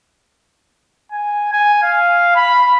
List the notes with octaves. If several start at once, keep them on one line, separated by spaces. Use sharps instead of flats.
G#5
G#5
F5
B5